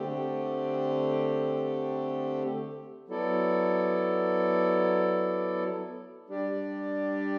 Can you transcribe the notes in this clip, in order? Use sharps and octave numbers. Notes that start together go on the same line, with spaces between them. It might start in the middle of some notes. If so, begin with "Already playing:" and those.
Already playing: D3 A3 C4 G4
F#3 B3 E4 A4 D5
G3 D4 G4 D5